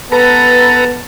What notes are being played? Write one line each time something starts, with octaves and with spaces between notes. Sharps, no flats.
B3 A4 B4 A5 A#5